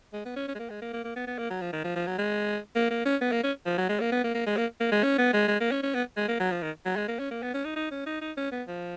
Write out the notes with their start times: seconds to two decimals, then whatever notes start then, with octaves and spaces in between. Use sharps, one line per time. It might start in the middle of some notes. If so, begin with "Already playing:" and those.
0.13 G#3
0.25 B3
0.36 C#4
0.48 C#4
0.55 G#3
0.59 A#3
0.70 G#3
0.82 A#3
0.93 A#3
1.04 A#3
1.16 B3
1.27 B3
1.38 A#3
1.50 F#3
1.61 F3
1.73 D#3
1.84 F3
1.96 F3
2.07 F#3
2.18 G#3
2.76 A#3
2.90 A#3
3.05 C#4
3.21 B3
3.32 A#3
3.43 C#4
3.66 F3
3.78 F#3
3.89 G#3
4.00 A#3
4.12 B3
4.24 A#3
4.35 A#3
4.47 G#3
4.57 A#3
4.80 A#3
4.92 G#3
5.03 C#4
5.18 B3
5.33 G#3
5.48 G#3
5.60 A#3
5.72 C#4
5.83 C#4
5.94 B3
6.17 G#3
6.28 A#3
6.40 F#3
6.51 F3
6.63 D#3
6.86 F#3
6.96 G#3
7.08 A#3
7.19 C#4
7.31 A#3
7.43 B3
7.54 C#4
7.65 D#4
7.76 D#4
7.91 C#4
8.06 D#4
8.21 D#4
8.37 C#4
8.52 B3
8.68 F3